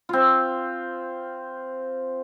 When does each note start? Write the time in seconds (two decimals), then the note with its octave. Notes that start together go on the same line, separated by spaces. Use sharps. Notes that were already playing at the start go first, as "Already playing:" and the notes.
0.09 C4 F4